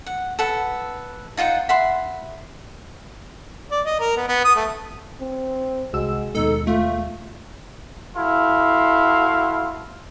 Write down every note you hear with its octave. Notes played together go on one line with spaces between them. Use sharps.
F#5
A4 B4 F#5
D#4 F4 C5 F#5
E5 F#5 B5 C6
D5
D#5
A#4
B3
B3
D#6
A3
C4
C2 G#3 F#4 E6
D#2 B2 G#3 D#4 A4
A3 F4
E4 F#4 A4 F5 C6